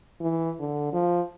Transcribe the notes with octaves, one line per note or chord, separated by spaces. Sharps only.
E3
D3
F3